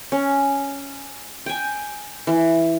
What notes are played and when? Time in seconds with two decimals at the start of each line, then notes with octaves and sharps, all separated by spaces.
0.12 C#4
1.46 G5 G#5
2.27 E3